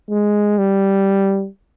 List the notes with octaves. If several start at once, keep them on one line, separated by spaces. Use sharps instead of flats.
G#3
G3